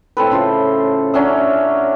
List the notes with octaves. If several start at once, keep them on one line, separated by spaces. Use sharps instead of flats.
A2 C4 A4 B4
C#3 F4 C5
F#3 C#4 D4 E5